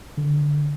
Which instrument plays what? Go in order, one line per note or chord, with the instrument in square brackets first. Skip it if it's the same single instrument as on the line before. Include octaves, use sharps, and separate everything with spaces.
[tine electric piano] D3